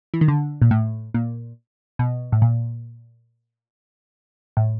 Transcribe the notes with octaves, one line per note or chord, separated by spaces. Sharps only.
E3
D#3
D3
A#2
A2
A#2
B2
A2
A#2
A2